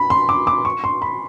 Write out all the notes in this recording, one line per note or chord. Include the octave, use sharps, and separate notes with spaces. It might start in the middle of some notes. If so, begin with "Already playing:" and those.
Already playing: B5
C6
D6
D6
C#6
C6
B5